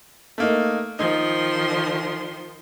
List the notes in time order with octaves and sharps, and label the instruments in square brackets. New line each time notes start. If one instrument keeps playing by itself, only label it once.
[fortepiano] A3 A#3 D#4
[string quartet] D#3 F3 C6 [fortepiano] D#4